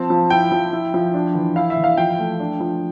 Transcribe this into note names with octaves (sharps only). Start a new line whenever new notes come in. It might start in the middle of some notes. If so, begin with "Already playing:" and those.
Already playing: F3 C4 A5
F3
E4 G5
F3
E4
F3
D4
E3
E4 F5
E5
E3
F5
F3 G5
A3
D4
F3